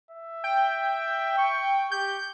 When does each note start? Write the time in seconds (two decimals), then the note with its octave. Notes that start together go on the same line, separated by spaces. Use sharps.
0.11 E5
0.44 G5
1.38 C#6
1.91 G4 G6